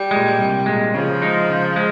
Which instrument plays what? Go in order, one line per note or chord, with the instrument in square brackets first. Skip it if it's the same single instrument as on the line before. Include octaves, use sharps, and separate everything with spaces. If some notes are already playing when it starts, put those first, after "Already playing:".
Already playing: [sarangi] G3
[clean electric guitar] A#2 G#3
C2
A#2 G#3
[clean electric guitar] C#3 [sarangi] F3
[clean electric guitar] G#3 D#4
C#3
G#3